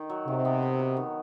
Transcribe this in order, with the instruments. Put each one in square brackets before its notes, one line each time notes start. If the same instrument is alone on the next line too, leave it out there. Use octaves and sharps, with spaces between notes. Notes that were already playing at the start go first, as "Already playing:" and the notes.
Already playing: [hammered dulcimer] D#3
F#3
[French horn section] C3 [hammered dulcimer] D#3
[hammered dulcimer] B3
D#3
F#3
D#3